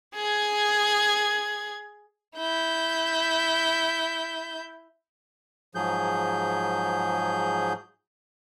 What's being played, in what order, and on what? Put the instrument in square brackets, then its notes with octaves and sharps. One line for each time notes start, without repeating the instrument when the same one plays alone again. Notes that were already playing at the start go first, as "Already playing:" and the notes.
[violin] G#4 G#6
E4 G6
[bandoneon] G#2 F3 F#3 G#4 G6